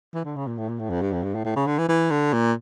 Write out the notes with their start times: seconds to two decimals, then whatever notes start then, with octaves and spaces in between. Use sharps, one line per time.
0.14 E3
0.25 D3
0.36 C#3
0.47 A#2
0.58 A2
0.69 A#2
0.80 A2
0.90 F2
1.02 G2
1.13 F2
1.23 G2
1.35 A2
1.45 A2
1.56 C#3
1.67 D3
1.78 E3
1.89 E3
2.11 D3
2.33 A#2